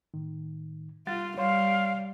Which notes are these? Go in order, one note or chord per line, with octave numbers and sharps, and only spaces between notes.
A2 D#3
G3 F4 F#5 A6
G3 C#5 F5 C6